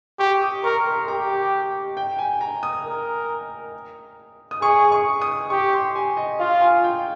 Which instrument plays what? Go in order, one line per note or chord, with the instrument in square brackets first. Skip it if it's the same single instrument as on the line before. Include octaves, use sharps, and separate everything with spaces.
[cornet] G4 [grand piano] C#6
[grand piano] D#6
[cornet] A#4 [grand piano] C#6
[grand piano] C6
[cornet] G4 [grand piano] A#5
[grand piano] G5
G#5
A#5
D#6
[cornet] A#4
[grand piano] D#6
[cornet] G#4 [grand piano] C#6
[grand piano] C#6
D#6
[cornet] G4 [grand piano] C#6
[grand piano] C6
G#5
D#5
[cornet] F4 [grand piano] F5
[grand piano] G#5
G5